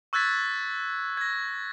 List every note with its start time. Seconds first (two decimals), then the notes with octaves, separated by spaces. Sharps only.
0.13 C#6 E6 F#6 G#6 A6 B6
1.17 G#6 A#6